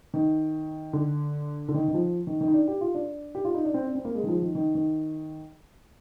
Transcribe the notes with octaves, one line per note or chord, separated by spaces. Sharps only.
D#3
D3
D3
D#3
D#3
F3
D#3
D#3
D#4
D4
G4
F4
D4
G4
F4
D#4
D4
C4
D4
C4
A#3
G#3
D#3
F3
D#3
D#3
D#3